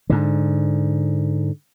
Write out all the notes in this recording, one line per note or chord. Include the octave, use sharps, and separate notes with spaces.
G#2 D3